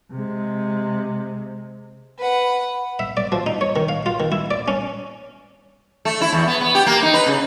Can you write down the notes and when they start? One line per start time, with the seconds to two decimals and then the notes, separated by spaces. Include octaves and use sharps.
0.12 C3 G#3
2.18 B4 F#5
2.99 E5
3.17 D5
3.32 F3
3.46 D#4
3.61 C#5
3.76 D#3
3.89 F5
4.06 F4
4.20 D#3
4.32 E4
4.51 D5
4.68 C#4
6.05 A3
6.21 E4
6.33 E2
6.48 B3
6.61 B3
6.75 G4
6.86 A#3
7.02 D#4
7.14 B4
7.26 C#3